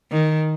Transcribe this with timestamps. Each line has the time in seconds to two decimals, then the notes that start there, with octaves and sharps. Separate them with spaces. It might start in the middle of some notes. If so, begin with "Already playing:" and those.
0.12 D#3